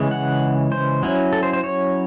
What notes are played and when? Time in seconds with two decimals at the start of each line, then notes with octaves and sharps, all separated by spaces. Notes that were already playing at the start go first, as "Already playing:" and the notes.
Already playing: C#3 E3 G#3
0.11 F#5
0.72 C5
1.03 F#3 C#4 E4
1.33 A4
1.43 C5
1.53 C5
1.64 C#5